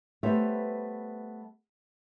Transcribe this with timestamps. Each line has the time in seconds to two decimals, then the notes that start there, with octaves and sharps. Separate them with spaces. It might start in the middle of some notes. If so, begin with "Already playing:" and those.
0.23 G3 A3 B3 C5 C#5 E5